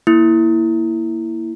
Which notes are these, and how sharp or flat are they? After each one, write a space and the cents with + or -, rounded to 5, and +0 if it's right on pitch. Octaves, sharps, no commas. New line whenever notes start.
A#3 +0 E4 +0